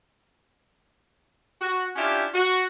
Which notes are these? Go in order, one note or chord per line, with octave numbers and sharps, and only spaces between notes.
F#4
C#4 D4 E4 F4 G4
F#4